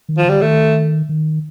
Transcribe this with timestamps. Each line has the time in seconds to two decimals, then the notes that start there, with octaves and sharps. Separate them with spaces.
0.09 D#3
0.18 F3
0.26 D3 G3
0.42 D#3 A3
1.09 D#3